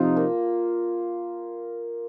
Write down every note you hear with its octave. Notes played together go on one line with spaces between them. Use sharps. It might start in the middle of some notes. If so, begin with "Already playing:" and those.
Already playing: C3 F3 C4 D#4 F4
A#3